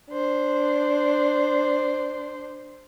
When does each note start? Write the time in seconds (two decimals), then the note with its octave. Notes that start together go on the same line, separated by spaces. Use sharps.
0.10 D4 C5